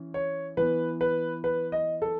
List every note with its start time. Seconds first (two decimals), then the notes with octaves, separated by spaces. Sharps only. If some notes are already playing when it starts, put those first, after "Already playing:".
Already playing: E3 C#4
0.14 C#5
0.57 E3 B3 B4
1.01 B4
1.44 B4
1.72 D#5
2.02 A4